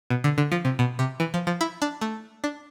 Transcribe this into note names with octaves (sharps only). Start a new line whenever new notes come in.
B2
D3
D3
F3
C3
B2
C3
E3
F3
F3
E4
D4
A3
D4